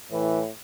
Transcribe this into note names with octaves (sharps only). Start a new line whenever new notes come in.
A2 E3